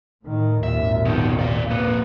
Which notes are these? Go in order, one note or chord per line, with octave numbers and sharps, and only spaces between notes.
A2 D#3
G#1 D#2 A#2 E5
B2 D#3
D5 F5
A#3 B4